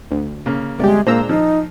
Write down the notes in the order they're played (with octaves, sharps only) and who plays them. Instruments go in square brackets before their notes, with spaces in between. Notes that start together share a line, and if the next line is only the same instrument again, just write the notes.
[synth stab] D2
[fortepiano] C#3 A#3
[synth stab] G1 G4 [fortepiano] C3 D5 [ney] G#3
[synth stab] A#2 A#5 E6 [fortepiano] G#3 D4 C5 [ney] A#3
[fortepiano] F3 [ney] D#4